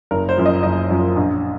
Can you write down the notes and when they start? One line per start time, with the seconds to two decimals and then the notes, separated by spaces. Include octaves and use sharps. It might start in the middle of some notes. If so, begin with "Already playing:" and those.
0.11 F#1 A#4
0.29 C5
0.37 F#2 F3
0.46 D#5
0.63 F#1 D#5
0.90 F#2 F3
1.16 A#1